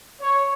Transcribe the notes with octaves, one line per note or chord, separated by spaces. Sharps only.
C#5